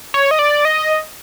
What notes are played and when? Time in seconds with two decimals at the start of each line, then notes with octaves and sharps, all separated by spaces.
0.14 C#5
0.31 D#5
0.39 D5
0.65 D#5